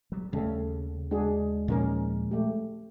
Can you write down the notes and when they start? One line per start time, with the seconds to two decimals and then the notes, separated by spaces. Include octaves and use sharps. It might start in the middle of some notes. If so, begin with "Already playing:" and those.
0.12 F#3 G3
0.33 D#2 C#3 G3 A3 A4
1.11 G#3 D4 F#4 G#4
1.68 A#2 D#3 F3 A#3 C#4 A#4
2.31 A3 G4